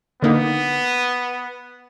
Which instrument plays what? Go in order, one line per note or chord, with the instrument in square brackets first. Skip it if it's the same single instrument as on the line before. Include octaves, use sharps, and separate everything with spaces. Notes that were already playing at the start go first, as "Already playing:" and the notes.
[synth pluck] D3 A#3 D#4 [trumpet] B3